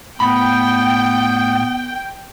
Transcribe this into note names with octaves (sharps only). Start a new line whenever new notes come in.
A2 B3 G5 B5